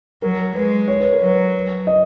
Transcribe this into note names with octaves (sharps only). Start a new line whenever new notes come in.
F#3 A#4
G#3 B4
C#5
B4
A#4
F#3 B4
D#5